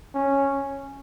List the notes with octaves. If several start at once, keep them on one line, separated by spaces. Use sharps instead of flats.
C#4